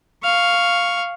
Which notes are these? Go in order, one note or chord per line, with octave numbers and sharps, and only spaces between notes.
F5 C#6